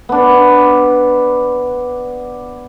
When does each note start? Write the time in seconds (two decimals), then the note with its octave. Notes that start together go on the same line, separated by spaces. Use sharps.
0.09 B3 D4